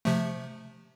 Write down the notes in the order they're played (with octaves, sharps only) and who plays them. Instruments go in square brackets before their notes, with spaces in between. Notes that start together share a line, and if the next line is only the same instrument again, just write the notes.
[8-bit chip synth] C3 F3 A3